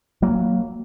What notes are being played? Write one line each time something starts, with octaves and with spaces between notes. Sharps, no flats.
F#3 A#3